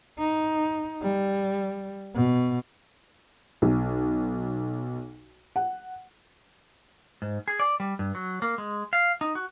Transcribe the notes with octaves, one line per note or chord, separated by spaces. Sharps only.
D#4
G3
B2
B1
F#5
G#2
G#4
D5
G3
G2
F#3
A#3
G#3
F5
D#4
F#4